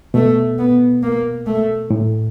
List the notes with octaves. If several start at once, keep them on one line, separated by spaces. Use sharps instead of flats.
B2 A3
B3
A#3
A3
A2